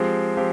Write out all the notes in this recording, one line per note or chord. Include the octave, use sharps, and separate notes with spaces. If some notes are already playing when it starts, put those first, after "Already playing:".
Already playing: F3 G#3 C4 G4
F3 C4 G4